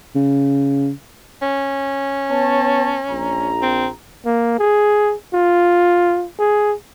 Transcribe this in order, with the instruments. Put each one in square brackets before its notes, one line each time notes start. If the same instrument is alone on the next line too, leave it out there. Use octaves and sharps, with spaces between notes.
[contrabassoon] C#3
[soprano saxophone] C#4
[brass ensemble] B3 C#5 A5
A#1 A#5
[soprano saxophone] C4
[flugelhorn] A#3
G#4
F4
G#4